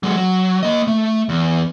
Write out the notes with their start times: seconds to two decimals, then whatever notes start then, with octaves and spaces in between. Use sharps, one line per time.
0.03 F#3 G#3
0.16 F#3
0.63 A#3 D#5
0.87 A3
1.29 E2